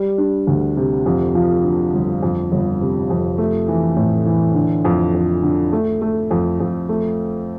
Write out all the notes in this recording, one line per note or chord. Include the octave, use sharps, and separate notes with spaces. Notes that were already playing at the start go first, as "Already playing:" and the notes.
Already playing: G3
D4
D2
C3
F2
F3
D3
G1
F2
G1
C3
F2
A3
E3
A2
E3
D3
F2
F2
D3
A3
A3
F2
F2
A3